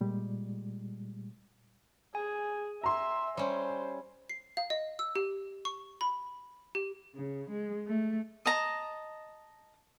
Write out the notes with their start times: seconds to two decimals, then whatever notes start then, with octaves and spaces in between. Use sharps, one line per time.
0.01 A#2 G3 G#3
2.15 G#4 G#5
2.84 E5 A#5 C6
3.37 G3 C#4 C5
4.29 C7
4.57 F5
4.70 D#5
4.99 E6
5.16 G4
5.65 C#6
6.01 B5
6.75 G4
7.16 C#3
7.49 G#3
7.87 A3
8.46 D#5 A5 A#5